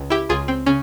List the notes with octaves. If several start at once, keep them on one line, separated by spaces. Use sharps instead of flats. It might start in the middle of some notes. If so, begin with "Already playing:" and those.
Already playing: C#2
E4 G4
C#2 F4 G#4
C4
C#3 C#4